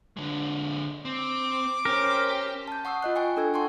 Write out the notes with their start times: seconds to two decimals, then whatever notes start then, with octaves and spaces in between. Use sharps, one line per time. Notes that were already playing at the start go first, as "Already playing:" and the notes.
0.17 D3 G#3
1.05 C4 D6
1.85 C#4 G4 A#4 C5
2.68 A5 G6
2.85 F#5 C#6 D#6 E6 C7
3.03 F4 D#5 F#6
3.16 G5 G#5 C#6 F#6
3.37 D4 A4 E6 G#6
3.54 F#5 A5 C6 C#6